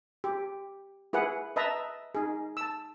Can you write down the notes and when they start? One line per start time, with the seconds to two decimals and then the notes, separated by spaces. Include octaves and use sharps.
0.24 G4
1.13 E4 G#4 B4 F#5
1.56 B4 D#5 E5 A5 A#5
2.15 D#4 G#4
2.57 A5 E6